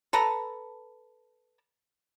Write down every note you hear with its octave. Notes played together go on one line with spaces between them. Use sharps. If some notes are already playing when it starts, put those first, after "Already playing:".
A4 B4 A5 A#5